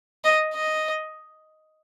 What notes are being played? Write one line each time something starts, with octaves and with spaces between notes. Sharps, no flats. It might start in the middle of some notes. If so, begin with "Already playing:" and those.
D#5
D#5